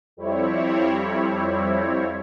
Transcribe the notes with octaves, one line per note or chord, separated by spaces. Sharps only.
F2 G3 C4 E4 C#5